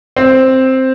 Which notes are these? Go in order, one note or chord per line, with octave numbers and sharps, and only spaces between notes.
C4